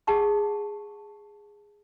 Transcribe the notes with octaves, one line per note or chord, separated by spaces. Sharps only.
G#4 F#5 A5 C#6